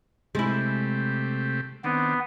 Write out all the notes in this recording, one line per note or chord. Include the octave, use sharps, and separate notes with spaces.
C3 G#3 A3 E4 G4
D#3 B3 C4 D4